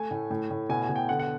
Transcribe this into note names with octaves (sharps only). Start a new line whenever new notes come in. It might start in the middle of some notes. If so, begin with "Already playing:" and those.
Already playing: A3 G#5
A2
A2
A2
B2 G#5
G#5
B2
G5
D3 F#5
F#5